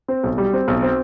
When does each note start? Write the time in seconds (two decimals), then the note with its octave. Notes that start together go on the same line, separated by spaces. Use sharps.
0.08 C4
0.24 B1
0.38 G3
0.53 C4
0.68 B1
0.82 C4